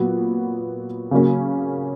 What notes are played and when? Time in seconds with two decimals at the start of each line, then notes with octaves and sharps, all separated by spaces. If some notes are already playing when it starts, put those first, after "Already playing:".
Already playing: A#2 F#3 B3
1.11 C#3 F#3 A#3 C#4